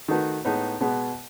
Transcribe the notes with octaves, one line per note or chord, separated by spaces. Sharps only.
D#3 A3 D#4 F#4 B4
A2 G#3 B3 D#4
B2 G#3 B3